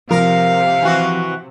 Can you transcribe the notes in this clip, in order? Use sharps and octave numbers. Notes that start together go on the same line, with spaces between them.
C3 F3 A#4 F5
E3 F#4